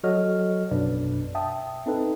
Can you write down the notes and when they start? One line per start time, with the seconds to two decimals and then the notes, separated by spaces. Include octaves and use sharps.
0.04 F#3 F#4 A4 C#5 D#5 F6
0.72 A#1 F#2 B2 D4 B4 D5
1.35 E5 G5 A5 D#6
1.86 C4 D#4 A4 B4